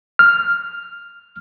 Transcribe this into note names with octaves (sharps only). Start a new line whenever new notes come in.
F6